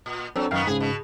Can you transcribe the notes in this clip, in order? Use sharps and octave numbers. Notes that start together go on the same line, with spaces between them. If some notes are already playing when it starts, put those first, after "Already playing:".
A#2
F#3 C4 D4 A4
F#2 D#3 B3 F5 G5
G#2 C#3 G#4
B2